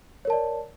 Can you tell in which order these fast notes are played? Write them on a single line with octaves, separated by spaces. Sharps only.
C#5 A#4 A5 D5